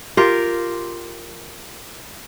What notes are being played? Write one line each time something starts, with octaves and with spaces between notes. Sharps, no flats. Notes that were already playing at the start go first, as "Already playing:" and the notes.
F4 G4 A#4